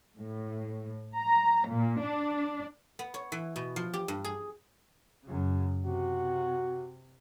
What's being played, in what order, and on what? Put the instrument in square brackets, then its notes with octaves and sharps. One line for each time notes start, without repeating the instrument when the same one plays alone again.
[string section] A2
A#5
A#2
D4
[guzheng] B3
C#5
E3
B2
F3
G4
G2
G#4
[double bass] F#2 C#3
[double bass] C3 [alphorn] F#4